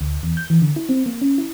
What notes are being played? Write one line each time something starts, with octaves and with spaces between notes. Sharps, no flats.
D2
E2
G6
E3
D3
E4
C4
A#3
C#4
E4